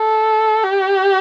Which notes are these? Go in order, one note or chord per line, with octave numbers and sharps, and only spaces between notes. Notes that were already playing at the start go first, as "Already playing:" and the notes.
Already playing: A4
G4